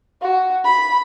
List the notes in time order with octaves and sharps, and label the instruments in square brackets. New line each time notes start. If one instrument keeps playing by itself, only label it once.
[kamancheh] F#4
B5